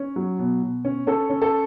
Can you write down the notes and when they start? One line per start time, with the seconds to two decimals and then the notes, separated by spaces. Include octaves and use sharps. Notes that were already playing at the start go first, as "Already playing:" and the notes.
Already playing: C#4
0.16 F#3
0.39 B2
0.62 B2
0.85 C#4
1.07 C#4 A4
1.30 C#4
1.42 A4